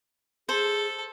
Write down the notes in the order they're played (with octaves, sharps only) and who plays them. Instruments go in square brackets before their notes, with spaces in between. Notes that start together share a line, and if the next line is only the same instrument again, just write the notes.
[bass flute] G#4 [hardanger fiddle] A4 [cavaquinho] C5